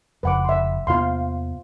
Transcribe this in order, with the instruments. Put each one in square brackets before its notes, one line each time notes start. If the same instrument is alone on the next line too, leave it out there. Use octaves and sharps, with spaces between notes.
[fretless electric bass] F1 F2 C#3 [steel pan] B4 F#5 D6
[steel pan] E5 C6
[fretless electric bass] E2 C3 B3 [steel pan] F4 F5 C6